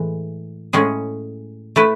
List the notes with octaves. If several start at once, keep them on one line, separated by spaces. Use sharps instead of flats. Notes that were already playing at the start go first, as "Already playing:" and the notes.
Already playing: A2 E3 G#3
A2 G#3 C#4 G#4
A3 E4 B4